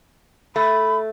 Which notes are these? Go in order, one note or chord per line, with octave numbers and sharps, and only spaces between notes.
A3 B5